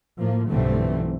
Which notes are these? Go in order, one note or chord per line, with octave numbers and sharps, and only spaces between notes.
A2 F3 A#3
B1 G2 D3 E3 A3 C4